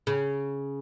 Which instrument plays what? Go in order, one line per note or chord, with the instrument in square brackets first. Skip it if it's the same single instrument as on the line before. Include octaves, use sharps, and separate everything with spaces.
[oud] C#3